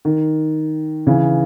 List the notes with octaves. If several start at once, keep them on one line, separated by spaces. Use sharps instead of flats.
D#3
C#3 E3